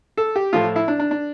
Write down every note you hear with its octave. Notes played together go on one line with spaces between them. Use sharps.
A4
G4
A2 F3 A3 F4
E4
D4
D4
D4